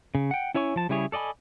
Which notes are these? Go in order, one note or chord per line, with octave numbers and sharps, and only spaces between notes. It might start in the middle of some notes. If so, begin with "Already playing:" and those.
C#3
F#5 G5
C#4 E4 C#5 G#5 C#6
F3 A5
C#3 G3 E4 G#4 C#5
A4 D5 D#5 G#5 B5